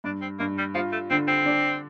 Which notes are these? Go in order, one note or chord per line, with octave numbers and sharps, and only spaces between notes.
G2 D4
C4
G2 A#3
G3
F3 F4
A3
D3 C4
C4
D4